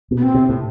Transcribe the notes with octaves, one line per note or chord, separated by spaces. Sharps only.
B2
B3
C4
C3
A2